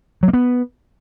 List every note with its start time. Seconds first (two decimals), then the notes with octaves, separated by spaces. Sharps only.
0.23 F#3
0.28 A#3
0.33 B3